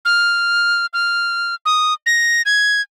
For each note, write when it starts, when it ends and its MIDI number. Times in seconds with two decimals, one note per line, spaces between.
0.05 0.86 89
0.93 1.55 89
1.66 1.94 87
2.06 2.42 94
2.46 2.81 92